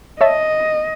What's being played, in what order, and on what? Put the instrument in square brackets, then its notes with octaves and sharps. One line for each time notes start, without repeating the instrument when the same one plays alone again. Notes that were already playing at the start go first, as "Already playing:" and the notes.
[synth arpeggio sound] C#5 E5 A5 [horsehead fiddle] D#5